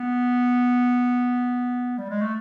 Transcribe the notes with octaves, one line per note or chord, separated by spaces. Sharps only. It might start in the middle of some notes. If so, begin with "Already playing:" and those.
Already playing: B3
G3
G#3
A3